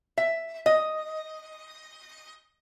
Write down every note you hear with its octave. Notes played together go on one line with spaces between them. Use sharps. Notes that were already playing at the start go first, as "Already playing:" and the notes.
E5
D#5